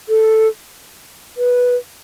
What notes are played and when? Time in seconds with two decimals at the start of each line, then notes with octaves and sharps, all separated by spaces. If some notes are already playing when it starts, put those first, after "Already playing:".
0.09 A4
1.37 B4